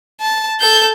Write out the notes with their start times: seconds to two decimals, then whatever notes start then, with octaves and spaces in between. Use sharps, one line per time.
0.21 A5
0.60 A4 G6